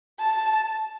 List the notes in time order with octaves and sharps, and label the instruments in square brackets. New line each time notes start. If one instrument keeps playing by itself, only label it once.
[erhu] A5